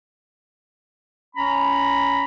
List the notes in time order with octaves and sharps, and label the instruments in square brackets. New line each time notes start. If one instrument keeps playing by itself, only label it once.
[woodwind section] C#4 A#5 B5